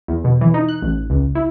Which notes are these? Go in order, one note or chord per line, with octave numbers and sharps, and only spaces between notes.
E2
B2
E3
D#4
F#6
A1
C#2
E4